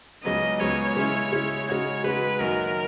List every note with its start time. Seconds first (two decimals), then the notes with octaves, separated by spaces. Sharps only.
0.24 C#2 C#3 F#3 B3 D#5
0.60 C#2 C#3 F#3 B3 C#5
0.96 C#3 G#3 C#4 E4
1.32 C#3 G#3 C#4 E4
1.69 C#3 G#3 D#4 F#4 C#5
2.04 C#3 G#3 D#4 F#4 B4
2.40 F#2 D#3 A#3 D#4 F#4 A#4